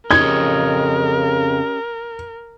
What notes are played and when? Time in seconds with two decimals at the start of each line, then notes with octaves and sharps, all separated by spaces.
0.11 F2 C#3 C#4 G4 A#4 D#5 G#6